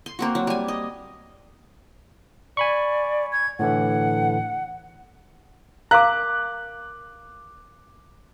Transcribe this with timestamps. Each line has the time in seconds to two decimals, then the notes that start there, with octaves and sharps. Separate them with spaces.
0.06 C6
0.19 A#3 C4 F#4
0.35 F#3
0.47 G3 G#5
0.68 D#5
2.57 D5 G#5 B5 C#6
3.32 G#6
3.59 A2 D3 E3 F#5
5.91 A#4 F5 A#5 D6 E6 F#6